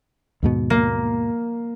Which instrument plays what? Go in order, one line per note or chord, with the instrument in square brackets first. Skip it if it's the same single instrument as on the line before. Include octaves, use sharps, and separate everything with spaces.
[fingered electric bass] D#2 G#2 B2
[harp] A#3